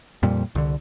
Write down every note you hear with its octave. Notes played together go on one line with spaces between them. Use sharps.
F2 A#2 G3
C2 D3